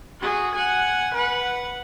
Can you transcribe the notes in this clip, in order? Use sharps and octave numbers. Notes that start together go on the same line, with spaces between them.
F#4 G#4
F#5 G#5
B4 F#5